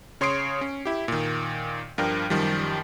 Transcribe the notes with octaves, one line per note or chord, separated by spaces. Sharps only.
C#3 C#5 C6 D#6 C7 D7
C#4
E4 G4
A#2 D#3
G2 F3 D4 A#4 G5
F#2 D#3 F3 G3